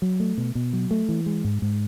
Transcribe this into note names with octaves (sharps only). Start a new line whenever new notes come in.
F#3
A3
B2
B2
F#3
A3
E3
G#3
G#2
G#2